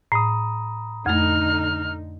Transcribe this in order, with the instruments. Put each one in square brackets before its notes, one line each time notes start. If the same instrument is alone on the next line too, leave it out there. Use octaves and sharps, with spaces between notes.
[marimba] A2 [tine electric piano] A#5 B5 D#6
[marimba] F2 A3 [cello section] D3 D#4 [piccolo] F6